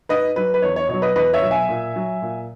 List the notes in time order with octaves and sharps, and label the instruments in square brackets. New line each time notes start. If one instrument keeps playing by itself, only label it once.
[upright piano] G#2 B4 D#5
F#3 B4
B4
E2 C#5
C#5
B2 F#3 C#5
B4 D#5
E2 B4 D#5
C#5 E5
B2 F#3
E5 G#5
A#2
F#3
A#2